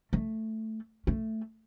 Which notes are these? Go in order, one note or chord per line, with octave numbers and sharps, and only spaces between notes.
A3
A3